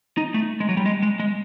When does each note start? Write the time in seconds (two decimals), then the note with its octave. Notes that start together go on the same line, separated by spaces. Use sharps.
0.17 D#4
0.34 A3
0.60 G#3
0.69 F#3
0.77 G3
0.86 G#3
1.02 G#3
1.20 G#3